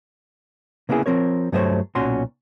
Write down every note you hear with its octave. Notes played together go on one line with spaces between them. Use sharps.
C#3 A#3 B3 E4 G#4
F3 C4 A#4 C#5
G2 F#3 A3 B3 C5 C#5
B1 A#2 C#4 F#4 C6